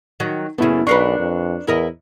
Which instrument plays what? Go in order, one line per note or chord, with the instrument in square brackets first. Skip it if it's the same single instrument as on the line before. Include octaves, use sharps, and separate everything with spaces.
[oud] D#3 F#3
[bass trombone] F#1 [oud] C#3 A3 [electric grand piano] B3 E4
[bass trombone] B1 [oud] D4 A#4 B4 [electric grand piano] C#6 C7 C#7
[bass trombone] F2
[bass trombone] E2 [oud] E4 A#4 D#5